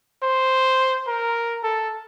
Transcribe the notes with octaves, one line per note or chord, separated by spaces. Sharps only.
C5
A#4
A4